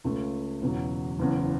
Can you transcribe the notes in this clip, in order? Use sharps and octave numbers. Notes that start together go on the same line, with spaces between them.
C#2 C#3 A3
E1 E2 C#3 F#3
F#1 E2 C#3